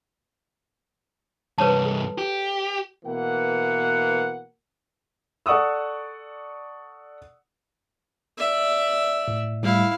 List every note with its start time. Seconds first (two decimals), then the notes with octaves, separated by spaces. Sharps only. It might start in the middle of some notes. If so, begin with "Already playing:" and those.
1.58 C2 G2 B4 C#5 A5
1.86 A4
2.18 G4
3.05 B2 E3 A#3 F#5
5.46 A4 D5 F#5 C#6 D#6 E6
8.38 D5 E5
9.28 A2
9.63 A2 G3 E4 F5